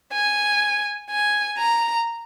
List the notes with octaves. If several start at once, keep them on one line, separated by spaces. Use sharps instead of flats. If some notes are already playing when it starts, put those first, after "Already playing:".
G#5
G#5
A#5